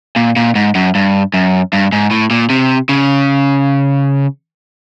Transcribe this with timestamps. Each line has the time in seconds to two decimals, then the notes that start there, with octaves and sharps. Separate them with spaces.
0.16 A#2
0.36 A#2
0.55 G#2
0.75 F#2
0.95 G2
1.34 F#2
1.73 G2
1.92 G#2
2.11 A2
2.31 A#2
2.50 C3
2.89 C#3